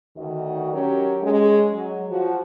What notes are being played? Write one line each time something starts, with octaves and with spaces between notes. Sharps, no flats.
D2 D#3 F#4 D#5
F#3 C#4 G4 A#4
G#3 C#4
F#3
F3 F#4